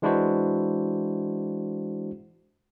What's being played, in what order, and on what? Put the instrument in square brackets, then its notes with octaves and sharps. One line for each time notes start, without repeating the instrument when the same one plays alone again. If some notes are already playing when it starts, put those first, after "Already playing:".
[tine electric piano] E3 G#3 D4 E4 F#4 C5